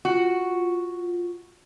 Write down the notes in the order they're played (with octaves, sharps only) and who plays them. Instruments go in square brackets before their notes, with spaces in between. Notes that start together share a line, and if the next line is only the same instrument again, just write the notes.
[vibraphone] F4 [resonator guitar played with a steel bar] F#4